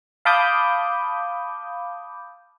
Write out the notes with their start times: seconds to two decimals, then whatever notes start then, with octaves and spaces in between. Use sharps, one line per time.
0.25 F5 A5 B5 D6 D#6 G6